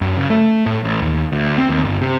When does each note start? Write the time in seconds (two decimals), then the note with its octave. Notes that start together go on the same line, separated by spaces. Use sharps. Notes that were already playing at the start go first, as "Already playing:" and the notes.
0.01 F#2
0.17 C#3
0.30 A3
0.66 A2
0.84 A1
1.02 D#2
1.32 D2
1.58 C4
1.69 D#2
1.83 G1
2.01 C3